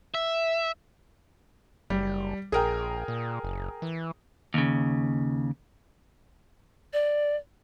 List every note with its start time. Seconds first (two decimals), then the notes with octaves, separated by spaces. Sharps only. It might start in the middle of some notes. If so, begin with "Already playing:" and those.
0.15 E5
1.90 F#1 G3
2.52 A#1 G#4 A#4 G5
3.08 A#2
3.44 F#1
3.82 E3
4.54 D#2 C#3
6.93 D5